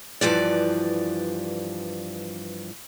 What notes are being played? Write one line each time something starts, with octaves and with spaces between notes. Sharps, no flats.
G2 E3 F3 D5